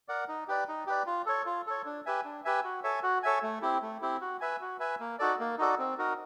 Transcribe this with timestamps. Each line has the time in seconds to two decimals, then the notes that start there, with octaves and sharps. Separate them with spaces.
0.08 A#4 D5 F#5
0.28 D#4
0.48 G4 B4 D5
0.68 D#4
0.87 G4 B4 D5
1.06 F4
1.26 A4 C#5
1.46 F4
1.67 A4 C#5
1.85 D4
2.06 G4 B4 E5 G#5
2.25 D4
2.45 G4 B4 E5 G#5
2.64 F#4
2.84 A4 C#5 E5 G#5
3.03 F#4
3.23 A4 C#5 E5 G#5
3.43 A3
3.62 C4 E4 G4
3.82 A3
4.02 C4 E4 G4
4.21 F#4
4.41 B4 E5 G#5
4.61 F#4
4.80 B4 E5 G#5
5.00 A#3
5.19 D#4 F#4 A4 D5
5.40 A#3
5.58 D#4 F#4 A4 D5
5.79 C4
5.98 D#4 F#4 A#4